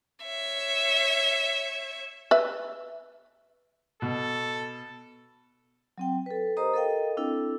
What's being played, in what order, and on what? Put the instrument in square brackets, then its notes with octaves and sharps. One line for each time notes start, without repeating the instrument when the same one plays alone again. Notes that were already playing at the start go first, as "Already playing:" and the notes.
[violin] C#5 E5
[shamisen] B4 E5
[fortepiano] B2 [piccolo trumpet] A4
[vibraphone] F#3 C4 G5
A4 B4
G4 A#4 C5 D#5 A#5 D#6
A4 A#4 D#5 F5 G5
C4 D4 E4 A4